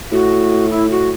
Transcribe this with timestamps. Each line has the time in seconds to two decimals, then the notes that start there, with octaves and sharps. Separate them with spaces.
0.12 A2 F#4
0.70 E4
0.90 F#4